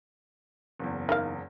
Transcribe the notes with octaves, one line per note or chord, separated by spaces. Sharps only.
F#1 E2
D#4 A#4 F5